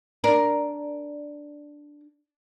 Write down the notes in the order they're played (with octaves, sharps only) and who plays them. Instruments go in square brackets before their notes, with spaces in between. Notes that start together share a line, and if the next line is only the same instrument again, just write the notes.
[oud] D4 A#4